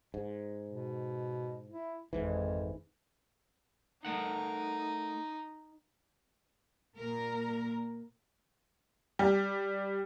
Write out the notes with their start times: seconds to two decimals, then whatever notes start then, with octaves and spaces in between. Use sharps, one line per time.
0.14 G#2
0.69 B2
1.68 E4
2.13 G#1 F2 G#2 E3
4.05 A3 D#4 A#4 F#5
6.98 A#2 A#4
9.19 G3